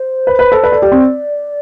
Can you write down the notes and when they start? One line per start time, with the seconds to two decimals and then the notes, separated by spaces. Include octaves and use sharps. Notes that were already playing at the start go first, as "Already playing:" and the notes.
Already playing: C5
0.27 B4
0.39 B4
0.52 A4
0.63 B4 D5
0.72 A4
0.82 G4
0.92 C4